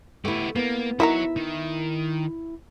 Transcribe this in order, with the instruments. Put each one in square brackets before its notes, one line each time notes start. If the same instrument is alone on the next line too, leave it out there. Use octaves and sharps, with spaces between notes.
[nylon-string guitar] A3 E4 [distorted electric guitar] B3 G4
[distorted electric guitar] A#3 [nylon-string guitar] B3
[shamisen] D#4 A#4 A#5 [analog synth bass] E4 [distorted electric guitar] F#4 C#5 [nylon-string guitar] E5
[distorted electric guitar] D#3